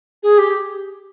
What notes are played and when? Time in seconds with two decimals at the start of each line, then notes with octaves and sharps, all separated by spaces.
0.22 G#4
0.38 G4